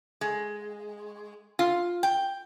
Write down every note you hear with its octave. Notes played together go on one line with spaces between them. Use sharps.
G#3
F4
G5